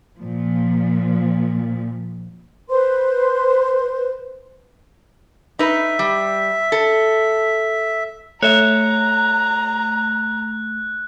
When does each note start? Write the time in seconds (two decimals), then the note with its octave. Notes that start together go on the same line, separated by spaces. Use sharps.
0.18 A#2 F3
2.69 B4 C5 C6
5.59 D#4 B4 E5
5.99 G3
6.72 A4
8.42 A3 C#5 E5 A#5 F#6